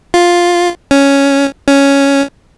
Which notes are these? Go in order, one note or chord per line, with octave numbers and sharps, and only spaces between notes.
F4
C#4
C#4